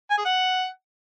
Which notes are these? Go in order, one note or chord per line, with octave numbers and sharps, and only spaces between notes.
G#5
G#4
F#5